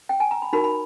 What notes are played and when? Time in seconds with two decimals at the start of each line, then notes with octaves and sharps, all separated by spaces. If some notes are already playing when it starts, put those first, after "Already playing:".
0.09 G5
0.20 G#5
0.31 A#5
0.42 B5
0.53 D#4 F#4 A#4 B5
0.64 B5